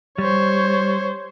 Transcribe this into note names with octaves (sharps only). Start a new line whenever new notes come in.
G3 C5 C#5